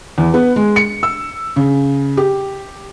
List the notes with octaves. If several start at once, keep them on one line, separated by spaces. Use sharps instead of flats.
E2
B3
G#3
C#7
E6
C#3
G4